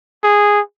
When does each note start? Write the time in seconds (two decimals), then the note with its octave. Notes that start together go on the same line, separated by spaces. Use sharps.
0.24 G#4